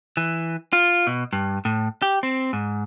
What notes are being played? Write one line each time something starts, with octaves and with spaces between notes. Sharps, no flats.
E3
F4
B2
G2
A2
G4
C4
G#2